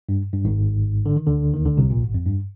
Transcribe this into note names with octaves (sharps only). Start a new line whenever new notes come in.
G2
G2
G#1 G#2
D3
D#3
D2 D3
D#2 D#3
D2 D3
C2 C3
A#1 A#2
G#1 G#2
F2
G2